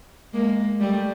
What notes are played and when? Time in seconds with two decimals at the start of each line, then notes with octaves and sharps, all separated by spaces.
0.33 G#3 A#3
0.80 G3 A3